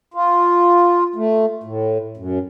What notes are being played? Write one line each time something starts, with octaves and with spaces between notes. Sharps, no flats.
F4
A3
A2
F#2